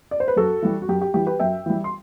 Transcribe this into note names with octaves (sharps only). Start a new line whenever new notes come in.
D5
C5
B4
F#2 F#4 A4
E3 G3
F#4
F#2 G4
G4
E3 G3 G4
G4 B4
F#2 E5 G5
E3 G3
C6